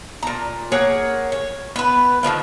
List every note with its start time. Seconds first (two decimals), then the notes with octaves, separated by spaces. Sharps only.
0.23 A#2 A#5
0.72 A#3 G#4 C#5 F#5
1.32 C#5
1.76 B3 B4
2.23 D3 D#3 F3 A#3